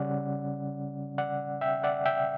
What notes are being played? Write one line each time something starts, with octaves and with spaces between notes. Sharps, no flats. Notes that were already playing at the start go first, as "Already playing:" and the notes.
Already playing: C#3 G3 C#4 D5 F#5
D5 F#5
E5 G5
D5 F#5
E5 G5